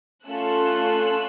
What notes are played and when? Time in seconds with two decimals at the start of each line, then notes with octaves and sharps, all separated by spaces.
0.25 A3 C#4 F4 A4 E6 F#6